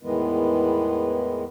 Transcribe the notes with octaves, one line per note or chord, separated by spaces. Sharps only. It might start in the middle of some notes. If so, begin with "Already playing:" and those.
E2 A2 D#3 E3 G#3 B3